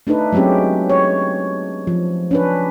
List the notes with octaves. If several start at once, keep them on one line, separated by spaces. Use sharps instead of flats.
A3 D4 D#4 A4 B4
F#3 G#3 C4 C#4 G4
C#5
F3
C#4 D4 B4